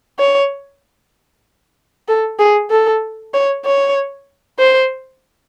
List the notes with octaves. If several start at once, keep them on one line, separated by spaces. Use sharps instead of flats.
C#5
A4
G#4
A4
C#5
C#5
C5